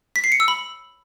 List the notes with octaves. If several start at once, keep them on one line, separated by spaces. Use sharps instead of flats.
B6
C7
C#7
E6
B5